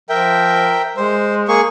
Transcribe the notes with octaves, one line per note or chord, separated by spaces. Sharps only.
F3 A#4 E5 G5
G#3 C5
A#3 G#4 C#6